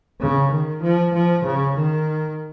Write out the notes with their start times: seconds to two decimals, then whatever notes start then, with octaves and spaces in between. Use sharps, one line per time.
0.20 C#3
0.51 D#3
0.82 F3
1.13 F3
1.45 C#3
1.75 D#3